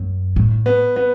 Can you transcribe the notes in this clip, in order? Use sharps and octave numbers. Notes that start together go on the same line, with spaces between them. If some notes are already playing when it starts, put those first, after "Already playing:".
Already playing: F#2
A2
B3
B3